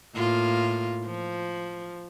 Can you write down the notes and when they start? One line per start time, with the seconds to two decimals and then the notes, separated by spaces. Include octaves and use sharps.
0.15 A2 A#3 F4
1.05 F3